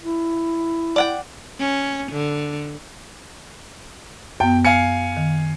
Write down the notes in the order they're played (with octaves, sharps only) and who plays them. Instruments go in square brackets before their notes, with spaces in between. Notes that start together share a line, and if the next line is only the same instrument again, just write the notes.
[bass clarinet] E4
[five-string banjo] D5 F#5 G5
[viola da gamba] C#4
D3
[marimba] F#2 B3 [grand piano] G5
[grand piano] F5 G#5 C#7
[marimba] D#3